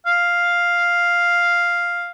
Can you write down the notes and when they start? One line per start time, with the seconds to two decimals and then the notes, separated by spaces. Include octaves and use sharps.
0.07 F5